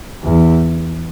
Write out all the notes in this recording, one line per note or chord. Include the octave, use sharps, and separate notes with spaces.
E2